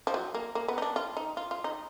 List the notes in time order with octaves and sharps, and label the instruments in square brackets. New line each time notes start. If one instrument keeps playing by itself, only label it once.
[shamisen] F3
F#3
A#3
A#3
B3
D#4
D4
F4
D#4
F4
F4
D#4